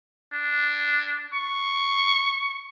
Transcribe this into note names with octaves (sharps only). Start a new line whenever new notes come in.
D4
C#6